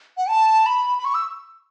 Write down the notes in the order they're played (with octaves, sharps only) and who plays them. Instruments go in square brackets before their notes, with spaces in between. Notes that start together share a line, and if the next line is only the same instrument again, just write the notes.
[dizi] F#5
A5
B5
B5
C#6
E6